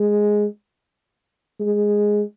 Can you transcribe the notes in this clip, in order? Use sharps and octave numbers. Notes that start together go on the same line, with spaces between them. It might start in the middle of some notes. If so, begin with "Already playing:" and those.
Already playing: G#3
G#3